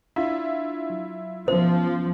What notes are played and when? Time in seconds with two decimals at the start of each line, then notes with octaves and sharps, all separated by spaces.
0.16 D4 E4 F4
0.90 F#3
1.48 B2 F3 B3 C#4 C5